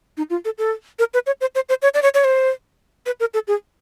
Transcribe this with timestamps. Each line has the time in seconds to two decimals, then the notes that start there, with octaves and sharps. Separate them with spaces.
0.17 D#4
0.30 F4
0.45 A4
0.58 A4
0.99 A#4
1.14 B4
1.27 C#5
1.41 C5
1.55 C5
1.69 C5
1.82 C#5
1.94 D5
2.02 C#5
2.15 C#5
2.24 C5
3.06 B4
3.20 A#4
3.34 A4
3.47 G#4